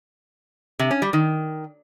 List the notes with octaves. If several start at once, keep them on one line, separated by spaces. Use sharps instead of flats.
C3
C#4
G3
D#3